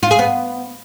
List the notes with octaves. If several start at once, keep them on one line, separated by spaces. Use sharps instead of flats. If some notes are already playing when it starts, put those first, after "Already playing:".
F4
G#4
B3